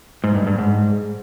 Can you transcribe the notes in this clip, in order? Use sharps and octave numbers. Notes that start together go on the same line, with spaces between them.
G#2
G2
G2
G#2